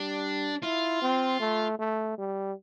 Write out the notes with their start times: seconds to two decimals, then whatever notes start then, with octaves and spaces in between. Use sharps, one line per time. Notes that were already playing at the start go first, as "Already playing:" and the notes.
Already playing: G3 D4
0.63 E4 F4
1.02 C4
1.40 A3
1.79 A3
2.18 G3